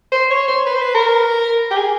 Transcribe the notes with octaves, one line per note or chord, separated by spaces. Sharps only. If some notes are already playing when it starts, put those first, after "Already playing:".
C5
C#5
C5
B4
C5
B4
A#4
G4
G#4